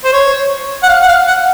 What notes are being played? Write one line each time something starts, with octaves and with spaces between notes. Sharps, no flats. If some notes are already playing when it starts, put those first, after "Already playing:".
C5
C#5
F#5
F5
F#5
F5
F#5